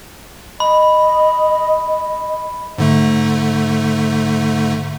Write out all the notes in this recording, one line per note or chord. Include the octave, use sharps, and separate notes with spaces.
D#5 B5
G#2 D3 A3